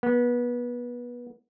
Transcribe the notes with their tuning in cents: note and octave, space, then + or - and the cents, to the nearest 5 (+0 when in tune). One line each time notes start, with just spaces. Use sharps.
B3 -25